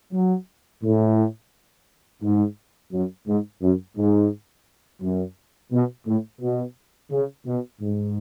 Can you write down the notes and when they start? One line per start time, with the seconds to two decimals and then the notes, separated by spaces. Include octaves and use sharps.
0.13 F#3
0.83 A2
2.23 G#2
2.93 F#2
3.28 G#2
3.62 F#2
3.97 G#2
5.02 F#2
5.72 B2
6.07 A2
6.42 B2
7.11 C#3
7.46 B2
7.81 G#2